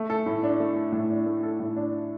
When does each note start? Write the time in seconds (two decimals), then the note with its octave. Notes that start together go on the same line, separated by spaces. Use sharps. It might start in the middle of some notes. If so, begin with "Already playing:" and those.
Already playing: A3
0.10 A4
0.26 A2
0.43 D4
0.60 A3
0.76 A4
0.92 A2
1.10 D4
1.26 A3
1.43 A4
1.60 A2
1.76 D4